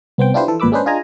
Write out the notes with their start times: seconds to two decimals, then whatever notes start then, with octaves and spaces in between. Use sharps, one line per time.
0.18 C2 B3 C5 G5
0.34 D4 E4 F4 G4 B4 C5
0.48 E3 A4
0.60 G#1 A#2 B4 B5 D6 E6
0.72 G#3 C#4 D4 G#4 B4 C5
0.86 D4 F4 G#4 D#5 G#5 A#5